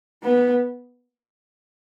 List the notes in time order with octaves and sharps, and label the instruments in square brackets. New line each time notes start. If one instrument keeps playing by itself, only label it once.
[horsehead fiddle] B3